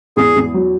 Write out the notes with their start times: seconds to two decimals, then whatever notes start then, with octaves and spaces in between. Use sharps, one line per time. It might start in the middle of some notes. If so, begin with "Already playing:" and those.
0.17 E2 G#4
0.36 E2
0.54 F#3